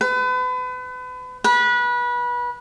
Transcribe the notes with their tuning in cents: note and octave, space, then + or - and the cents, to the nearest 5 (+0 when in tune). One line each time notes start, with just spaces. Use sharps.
B4 +35
B4 -25